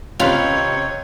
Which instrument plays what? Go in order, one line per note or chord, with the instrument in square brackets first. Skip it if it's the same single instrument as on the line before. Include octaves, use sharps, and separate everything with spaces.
[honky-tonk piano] C#2 C3 F7 [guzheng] F4 B4 [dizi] C#5